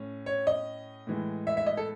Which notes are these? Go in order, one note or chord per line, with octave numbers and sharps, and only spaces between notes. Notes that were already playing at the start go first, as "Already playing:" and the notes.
Already playing: A2 C#4
C#5
D#5
A2 E3 G#3
E5
E5
D#5
A4